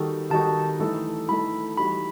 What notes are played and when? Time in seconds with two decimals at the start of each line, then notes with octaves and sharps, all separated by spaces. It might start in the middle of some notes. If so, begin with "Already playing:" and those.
Already playing: D#3 G3 D#4 F#4 A4
0.30 D#3 G3 D#4 F#4 A4 A5
0.79 E3 A3 D#4 A4
1.28 E3 A3 D#4 A4 B5
1.78 E3 G3 D#4 F#4 B5